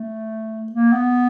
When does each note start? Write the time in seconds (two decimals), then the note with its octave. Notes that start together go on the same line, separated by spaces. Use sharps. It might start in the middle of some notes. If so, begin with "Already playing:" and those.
Already playing: A3
0.72 A#3
0.93 B3